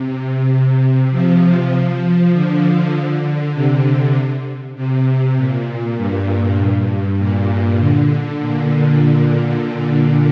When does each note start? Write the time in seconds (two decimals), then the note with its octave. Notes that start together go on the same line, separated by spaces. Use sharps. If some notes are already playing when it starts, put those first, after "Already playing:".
Already playing: C3
1.11 F3
1.72 F3
2.33 D3
3.55 C3
3.85 D3
4.76 C3
5.37 A#2
5.97 G2
7.19 A#2
7.80 D3
8.40 A#2